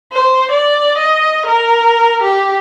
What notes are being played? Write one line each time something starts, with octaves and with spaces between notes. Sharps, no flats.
C5
D5
D#5
A#4
G4